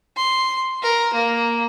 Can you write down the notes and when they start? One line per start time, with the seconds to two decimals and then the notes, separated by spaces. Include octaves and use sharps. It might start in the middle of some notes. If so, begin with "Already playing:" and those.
0.17 C6
0.82 A#4
1.13 A#3